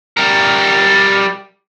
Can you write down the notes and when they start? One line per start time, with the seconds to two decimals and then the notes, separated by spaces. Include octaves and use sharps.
0.17 G3 A#4